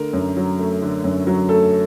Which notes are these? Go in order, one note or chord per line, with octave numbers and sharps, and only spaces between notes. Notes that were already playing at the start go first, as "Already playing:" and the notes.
Already playing: D3 A3 A#4
F#2
F#3
A3
D3
F#2
F#3
A3 A4